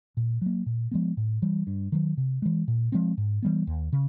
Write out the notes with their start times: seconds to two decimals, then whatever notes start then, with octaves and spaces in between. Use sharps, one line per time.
0.17 A#2
0.42 F#3 A#3
0.66 A#2
0.91 F3 G#3 B3
1.17 A2
1.42 E3 G3
1.67 G2
1.92 D#3 F#3
2.17 C3
2.42 E3 G#3
2.68 A#2
2.92 F3 G#3 C4
3.18 G#2
3.43 E3 G3 B3
3.67 D#2
3.93 C#3